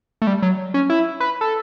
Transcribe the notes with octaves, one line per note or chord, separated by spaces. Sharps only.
A3
G3
F#3
C#4
E4
B4
A4